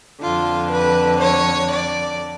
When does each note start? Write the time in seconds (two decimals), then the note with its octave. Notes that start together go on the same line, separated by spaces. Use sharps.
0.21 F2 D3 F4
0.71 B4
1.21 C#5
1.71 D5